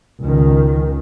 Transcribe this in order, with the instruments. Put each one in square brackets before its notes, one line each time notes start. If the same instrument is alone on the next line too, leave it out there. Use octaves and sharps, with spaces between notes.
[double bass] C#2 D#3